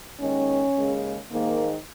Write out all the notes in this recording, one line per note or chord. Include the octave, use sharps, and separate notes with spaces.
D#2 D#3 G#3 C#4
D#2 C#3 G#3
G#2 D#3 G#3 A#3